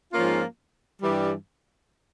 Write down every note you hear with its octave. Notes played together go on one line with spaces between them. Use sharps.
G#2 F3 A#3 C#4 F4
G2 E3 G3